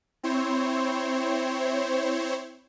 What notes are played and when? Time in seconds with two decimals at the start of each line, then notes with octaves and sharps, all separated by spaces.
0.23 C4 E4 C5 C#5